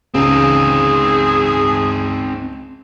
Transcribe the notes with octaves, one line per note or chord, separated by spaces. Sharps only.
C#2 C4 D#4 G#4